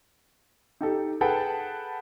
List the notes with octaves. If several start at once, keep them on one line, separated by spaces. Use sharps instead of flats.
D#4 G4 A4
G#4 A4 B4 F#5 G5 A5